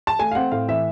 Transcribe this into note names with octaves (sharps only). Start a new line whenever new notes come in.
A5
A3 G#5
F5
C4 F#5
A2 F5
E3 E5